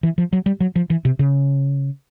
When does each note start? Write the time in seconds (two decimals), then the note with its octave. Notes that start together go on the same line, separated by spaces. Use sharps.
0.03 E3
0.18 F3
0.33 F#3
0.46 G3
0.61 F#3
0.76 F3
0.90 E3
1.05 C3
1.19 C#3